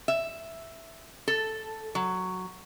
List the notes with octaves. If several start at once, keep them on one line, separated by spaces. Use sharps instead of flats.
E5
A4
F#3